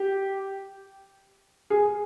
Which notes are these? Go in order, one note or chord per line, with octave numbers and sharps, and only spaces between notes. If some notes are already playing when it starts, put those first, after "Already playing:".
Already playing: G4
G#4